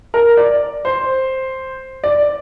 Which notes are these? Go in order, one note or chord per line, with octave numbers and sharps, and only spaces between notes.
A#4
D5
C5
D5